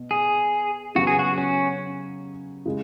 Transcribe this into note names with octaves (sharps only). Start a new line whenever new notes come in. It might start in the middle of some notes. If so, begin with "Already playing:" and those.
Already playing: B2
G#4
C#3 F#3 B3 F#4
G#4
F#4
C#4
C#3 G#3